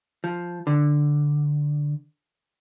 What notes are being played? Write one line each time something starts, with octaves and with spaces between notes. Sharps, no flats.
F3
D3